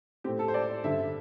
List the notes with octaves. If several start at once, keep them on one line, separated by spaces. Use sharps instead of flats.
A2 A3 C4 G4
A4
C5
D5
G2 D3 G3 E5